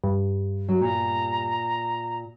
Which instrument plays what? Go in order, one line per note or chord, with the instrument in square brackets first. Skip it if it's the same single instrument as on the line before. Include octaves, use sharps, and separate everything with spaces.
[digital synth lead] G2
[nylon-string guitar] F#3
[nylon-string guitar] A#2 [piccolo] A#5